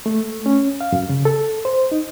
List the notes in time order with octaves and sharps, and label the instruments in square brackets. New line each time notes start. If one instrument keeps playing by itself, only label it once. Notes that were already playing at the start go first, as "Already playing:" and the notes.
[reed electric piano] A3
C#4
F5
F#2
C#3
A4
C5
D#4